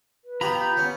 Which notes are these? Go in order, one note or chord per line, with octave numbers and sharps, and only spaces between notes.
B4
B3 F4 G4 A#5 B5
G6
B3 C#4